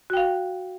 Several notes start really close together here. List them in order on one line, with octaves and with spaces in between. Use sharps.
F#4 G5 F5